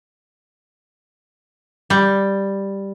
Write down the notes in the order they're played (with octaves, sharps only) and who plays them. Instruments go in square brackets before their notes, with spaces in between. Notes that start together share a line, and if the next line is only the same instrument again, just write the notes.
[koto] G3